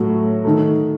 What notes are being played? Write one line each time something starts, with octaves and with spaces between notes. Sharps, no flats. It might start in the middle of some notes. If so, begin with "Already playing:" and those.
Already playing: A2 F#3 A3 F#4
D#3 A3